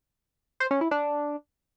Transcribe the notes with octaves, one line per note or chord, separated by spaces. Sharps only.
C5
C#4
E4
D4